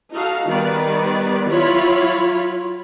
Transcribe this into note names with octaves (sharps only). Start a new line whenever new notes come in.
D#4 F#4 A4 F5
D#3 G3 B3 B4 D5
F#3 E4 F4 C#5 B5